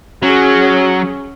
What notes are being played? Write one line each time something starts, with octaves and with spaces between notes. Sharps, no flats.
F#3 C#4 G#4